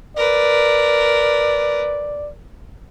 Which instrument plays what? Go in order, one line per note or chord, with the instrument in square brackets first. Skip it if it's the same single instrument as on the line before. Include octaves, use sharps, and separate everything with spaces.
[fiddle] A#4 B4 [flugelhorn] D5